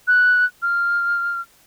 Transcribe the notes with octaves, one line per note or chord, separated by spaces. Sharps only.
F#6
F6